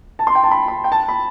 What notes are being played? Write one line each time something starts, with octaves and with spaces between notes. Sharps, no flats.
A5
C6
G5
A5
B5
B5
G5
A5
B5